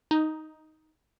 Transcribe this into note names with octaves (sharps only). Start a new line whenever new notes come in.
D#4